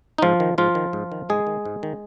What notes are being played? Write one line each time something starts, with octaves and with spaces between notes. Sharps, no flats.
D#4
G#2 F3 F4
D#3
G#2 F3 F4
D#3
G#2
D#3
G#2 G#3 G#4
D#3
G#2
D#3